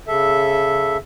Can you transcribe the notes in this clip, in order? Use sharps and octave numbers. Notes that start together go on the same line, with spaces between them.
C#3 A4 E5